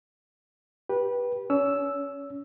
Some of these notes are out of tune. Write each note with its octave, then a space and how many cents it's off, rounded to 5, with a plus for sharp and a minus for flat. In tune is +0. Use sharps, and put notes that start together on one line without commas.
G4 +0 B4 -20
C#4 +35 E6 +0